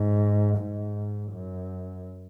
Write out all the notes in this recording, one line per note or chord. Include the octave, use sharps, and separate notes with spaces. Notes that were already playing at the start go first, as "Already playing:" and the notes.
Already playing: G#2
G#2
F#2